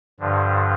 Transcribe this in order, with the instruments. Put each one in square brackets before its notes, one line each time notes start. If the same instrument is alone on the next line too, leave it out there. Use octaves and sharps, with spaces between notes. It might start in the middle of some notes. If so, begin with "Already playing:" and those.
[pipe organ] G2 D3 F3